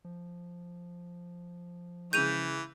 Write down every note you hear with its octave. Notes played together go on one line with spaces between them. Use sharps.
F3
C#3 E3 G#3 G6 D#7 F7